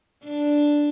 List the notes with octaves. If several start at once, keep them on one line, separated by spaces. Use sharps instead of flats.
D4